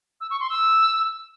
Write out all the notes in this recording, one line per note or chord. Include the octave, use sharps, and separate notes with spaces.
E6
C#6
C6
E6